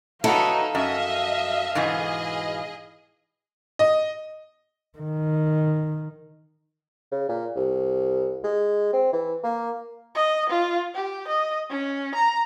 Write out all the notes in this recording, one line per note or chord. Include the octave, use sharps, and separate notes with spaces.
F#3 B3 D#4 E4 A4 F5
F#2 D#5 E5
G#2 B2 E3 G#4 D#5
D#5
D#3
C#3
A#2
C2
G#3
C4
E3
A#3
D#5
F4
G4
D#5
C#4
A#5